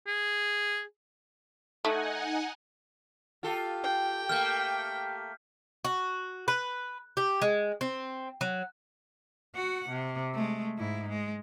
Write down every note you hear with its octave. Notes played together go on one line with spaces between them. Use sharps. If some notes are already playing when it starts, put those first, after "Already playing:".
G#4
A3 D#4 F#5 G#5
F4 G4 A4
G5
A3 A#3 F6 G6
F#4
B4
G4
G#3
C4
F#3
F#4 F#5
C3
G#3 A3
G#2 E4
G#3